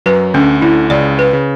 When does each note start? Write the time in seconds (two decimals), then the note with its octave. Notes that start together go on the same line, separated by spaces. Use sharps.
0.06 F#2 F#3 B4
0.34 D2 D3 C#4
0.62 D2 D3 E4
0.90 C#2 C#3 D5
1.19 B4
1.33 C#3